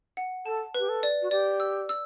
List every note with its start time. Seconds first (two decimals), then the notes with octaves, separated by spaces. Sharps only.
0.17 F#5
0.46 A4 A5
0.75 G4 B4
0.89 A4
1.03 D5
1.22 F#4
1.31 G4 D5
1.60 E6
1.89 E6